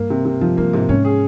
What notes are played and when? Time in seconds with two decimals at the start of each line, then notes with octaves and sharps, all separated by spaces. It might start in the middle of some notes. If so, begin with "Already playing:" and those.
Already playing: G2 A#3
0.10 C3
0.25 C3
0.41 G2 F3
0.57 G2 A#3
0.73 G#2 C3
0.89 G#2 C#4
1.05 G#4